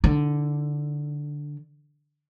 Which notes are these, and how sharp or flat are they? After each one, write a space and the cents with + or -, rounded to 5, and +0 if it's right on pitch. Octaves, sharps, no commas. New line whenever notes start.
D3 +0 D#4 +40